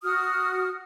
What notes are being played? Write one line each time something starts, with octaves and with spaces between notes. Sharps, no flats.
F#4 D#6 F6